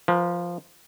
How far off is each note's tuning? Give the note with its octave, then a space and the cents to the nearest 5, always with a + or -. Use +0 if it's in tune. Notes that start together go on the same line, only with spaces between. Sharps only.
F3 +0 B4 -45